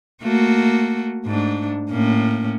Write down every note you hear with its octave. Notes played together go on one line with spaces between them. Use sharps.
A3 A#3 F#4
G#2 A3 D4
A2 A#3 C#4